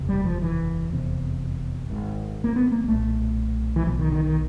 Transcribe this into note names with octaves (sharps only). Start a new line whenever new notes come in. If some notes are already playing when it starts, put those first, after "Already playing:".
Already playing: F#1 E2 C3
G3
F3
E3
F1 E2 C3
G#1 G#2
A#3
B3
A#3
A#3
B1 A#2 A3
E3
B1 B2 F3
D#3
D#3
D#3